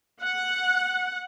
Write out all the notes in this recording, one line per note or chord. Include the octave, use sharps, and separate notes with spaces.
F#5